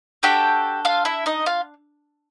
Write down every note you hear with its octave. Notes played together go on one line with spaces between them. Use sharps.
D4 F#4 G4 A4 G5
F4 F5
E4 E5
D#4 D#5
F4 F5